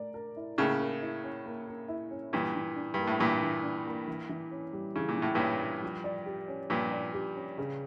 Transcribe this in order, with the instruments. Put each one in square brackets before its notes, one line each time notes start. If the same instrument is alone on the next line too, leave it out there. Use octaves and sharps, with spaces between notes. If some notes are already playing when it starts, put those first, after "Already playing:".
Already playing: [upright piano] A3 A#4 D5
A#4
E4
[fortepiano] A2 C#3 [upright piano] A#3
[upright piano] A#4
E4
C#4
A#3
A#4
E4
C#4
[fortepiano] G2 A#2 [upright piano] E3
[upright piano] E3
D4
[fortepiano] G2 [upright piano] A#3
[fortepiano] A2
[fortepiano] G2 A#2 [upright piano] E3
[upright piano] E3
D4
A#3
E3
E3
C#4
G3
[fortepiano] C#3 [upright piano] E3
[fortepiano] A#2
[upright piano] E3
[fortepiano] A2
[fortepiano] G2 A#2 [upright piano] C#4
[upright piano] G3
F3
D5
G4
C#4
[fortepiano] G2 A#2 [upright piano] F3
[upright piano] D5
G4
C#4
C#3